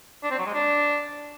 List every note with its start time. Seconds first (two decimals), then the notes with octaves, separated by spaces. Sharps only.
0.23 D4
0.31 C4
0.39 F#3
0.46 G#3
0.54 D4